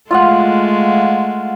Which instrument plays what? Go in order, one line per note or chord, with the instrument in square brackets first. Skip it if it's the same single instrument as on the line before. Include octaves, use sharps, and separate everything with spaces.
[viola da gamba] G#3 A3 [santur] F4 F5 F#5